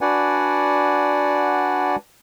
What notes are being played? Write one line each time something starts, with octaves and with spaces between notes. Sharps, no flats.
D4 F#4 B4 D5 F#5 G#5